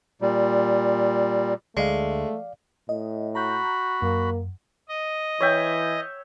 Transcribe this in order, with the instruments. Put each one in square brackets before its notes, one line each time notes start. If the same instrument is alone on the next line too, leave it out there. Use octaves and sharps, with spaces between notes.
[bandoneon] A#2 G3
[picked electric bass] D2 [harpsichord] G#3 [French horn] A3 [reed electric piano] D5 F5
[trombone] A2 [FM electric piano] D#5
[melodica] F#4 B5 [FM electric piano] A#5 G6
[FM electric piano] F#2 [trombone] A#3
[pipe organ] D#5
[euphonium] E3 [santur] C#5 E5 G5